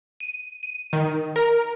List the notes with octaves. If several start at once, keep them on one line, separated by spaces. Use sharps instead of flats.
D#7
D#7
D#3
A#4